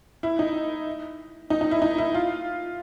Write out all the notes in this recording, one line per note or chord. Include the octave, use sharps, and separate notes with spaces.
E4
D#4
D#4
D#4
E4
D#4
E4
F4